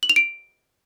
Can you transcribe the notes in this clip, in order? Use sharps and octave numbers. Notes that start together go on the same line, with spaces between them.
F#7
F7
D7